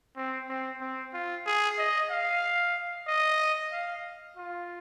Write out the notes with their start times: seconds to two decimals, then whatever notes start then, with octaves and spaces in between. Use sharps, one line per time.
0.17 C4
0.49 C4
0.81 C4
1.14 F4
1.46 G#4
1.78 D#5
2.10 F5
3.08 D#5
3.72 F5
4.37 F4